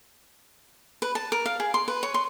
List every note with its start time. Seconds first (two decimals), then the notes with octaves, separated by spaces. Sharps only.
1.02 B4
1.15 A5
1.32 A#4
1.46 F5
1.60 G#4
1.74 C6
1.88 B4
2.03 C#5
2.14 C6